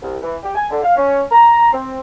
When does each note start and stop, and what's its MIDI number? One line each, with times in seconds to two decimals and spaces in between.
0.02 0.17 36
0.23 0.37 52
0.43 0.54 67
0.55 0.67 80
0.71 0.82 50
0.83 0.94 77
0.96 1.23 61
1.31 1.71 82
1.72 2.00 60